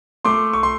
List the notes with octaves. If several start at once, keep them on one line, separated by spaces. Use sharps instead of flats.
A3 C6 D6
C#6
C6